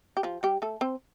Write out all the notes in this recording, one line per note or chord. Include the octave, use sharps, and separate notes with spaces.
G4
F3 F4
G3 G4
A3 A4
C4 C5